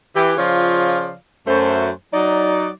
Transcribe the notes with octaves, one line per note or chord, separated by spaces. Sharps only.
E3 G4
C#3 F3 F4 C#5 D5 F5
F#2 A3 C5
F#3 D#4 D5